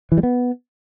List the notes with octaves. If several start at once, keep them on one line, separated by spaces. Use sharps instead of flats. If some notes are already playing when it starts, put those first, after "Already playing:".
E3
G3
B3